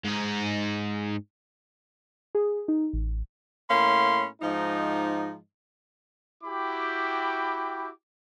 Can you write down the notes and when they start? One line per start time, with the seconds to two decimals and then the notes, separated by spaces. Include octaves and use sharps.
0.04 G#2 D#4
2.35 G#4
2.68 D#4
2.93 A1
3.71 A2 A#3 C#4 B5 C6
4.42 G#2 F3 D#4
6.44 E4 F#4 G4 G5 B5 D6